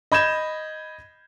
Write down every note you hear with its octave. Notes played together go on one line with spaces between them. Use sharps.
D#5 B5 G6 G#6 E7